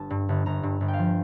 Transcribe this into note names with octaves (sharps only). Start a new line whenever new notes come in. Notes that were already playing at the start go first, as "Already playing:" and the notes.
Already playing: G1 A5
G2
G1
G1 A#5
G2
G1
G5
F5
F3